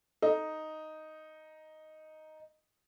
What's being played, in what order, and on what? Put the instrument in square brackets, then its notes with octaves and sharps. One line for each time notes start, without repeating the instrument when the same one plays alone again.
[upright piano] D#4 [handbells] A4 D#5